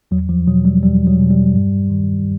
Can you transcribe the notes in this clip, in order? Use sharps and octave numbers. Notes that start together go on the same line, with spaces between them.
E2 F#3
F3
B2 F#3
G3
E2 G3
F#3
B2
G3
G2
D#3